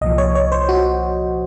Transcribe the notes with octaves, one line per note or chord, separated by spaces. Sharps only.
C2 A#2 F3 D#5
C#5
C#5
C5
F#4